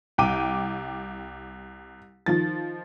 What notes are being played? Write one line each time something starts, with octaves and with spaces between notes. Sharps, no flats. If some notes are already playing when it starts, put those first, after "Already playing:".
C2 G5 D6 D#7
D#3 F3 A6